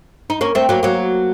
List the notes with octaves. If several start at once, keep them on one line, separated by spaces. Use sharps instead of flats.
D#4
A#3 C#4
A3 C4
F#3 A#3
F#3 A#3